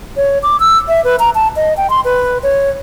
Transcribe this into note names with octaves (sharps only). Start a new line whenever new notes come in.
C#5
D6
E6
E5
B4
A#5
A5
D#5
G5
C6
B4
C#5